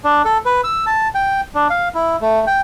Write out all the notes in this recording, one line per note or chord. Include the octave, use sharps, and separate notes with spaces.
D4
A4
B4
E6
A5
G5
D4
F5
E4
A3
G5